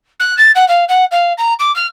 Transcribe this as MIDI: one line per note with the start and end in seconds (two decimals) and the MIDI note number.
0.20 0.35 90
0.37 0.51 93
0.55 0.68 78
0.68 0.84 77
0.89 1.05 78
1.11 1.33 77
1.38 1.54 82
1.59 1.74 86
1.76 1.86 89